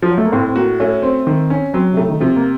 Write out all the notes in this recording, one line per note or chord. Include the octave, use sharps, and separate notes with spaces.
F3
F#3
A3
A#3
A2 C4
C4
A#3 F#4
A3 C#4
C4
D#3
C#4
F#3 C4
C3
C#3 A3
D#3
C3 F3
A#3